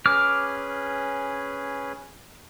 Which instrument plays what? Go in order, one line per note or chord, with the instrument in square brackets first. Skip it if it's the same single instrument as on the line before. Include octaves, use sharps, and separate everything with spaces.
[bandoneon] C#4 G#4 B4 [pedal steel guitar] D6 F6